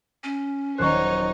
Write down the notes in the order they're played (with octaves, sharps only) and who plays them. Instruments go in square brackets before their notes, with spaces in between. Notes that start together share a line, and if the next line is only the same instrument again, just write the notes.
[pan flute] C#4
[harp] D#1 F#3 C5 [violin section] D#4 C#5 [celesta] C#6 F#6